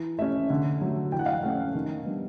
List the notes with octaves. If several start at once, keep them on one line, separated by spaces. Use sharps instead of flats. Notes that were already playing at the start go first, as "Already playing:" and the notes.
Already playing: E3
A3 C#4 E5
D3
F#3 A3
E3 G5
F#5
F5
F#5
A3 C#4
D#3
G3 B3 D4